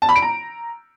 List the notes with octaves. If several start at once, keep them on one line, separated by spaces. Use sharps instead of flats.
A5
B5
D7
A#5